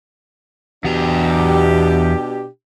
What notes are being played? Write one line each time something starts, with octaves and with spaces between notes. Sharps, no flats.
E2 B2 D4 G4 A#5